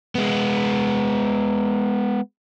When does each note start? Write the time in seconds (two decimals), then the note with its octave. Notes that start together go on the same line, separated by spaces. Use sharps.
0.15 G#3 B3